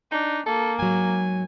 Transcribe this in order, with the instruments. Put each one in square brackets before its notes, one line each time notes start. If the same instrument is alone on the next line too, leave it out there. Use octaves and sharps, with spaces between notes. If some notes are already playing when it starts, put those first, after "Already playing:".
[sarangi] D4 [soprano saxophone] D#4
[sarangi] A#3 [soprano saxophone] A4
[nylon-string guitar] G#2 F#3 [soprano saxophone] G#5